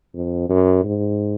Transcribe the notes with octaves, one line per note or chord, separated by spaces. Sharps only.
F2
F#2
G#2